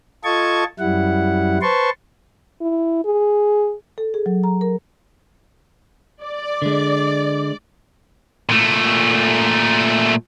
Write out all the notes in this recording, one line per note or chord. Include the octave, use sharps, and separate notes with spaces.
F4 A4 D#5 A5 C#6 G#6
F#2 G3 E4 F#5
B4 C5 A5 C6 C#6
E4
G#4
A4
G#4
F#3
A#5
A#4
D5
D3 G#3
A#2 A3